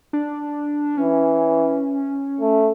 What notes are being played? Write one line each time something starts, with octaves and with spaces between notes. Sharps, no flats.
D4
E3 C#4
A3